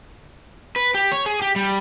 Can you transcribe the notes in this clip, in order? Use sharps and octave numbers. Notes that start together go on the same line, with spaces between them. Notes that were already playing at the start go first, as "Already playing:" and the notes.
B4
G4
C#5
G#4
G4
G3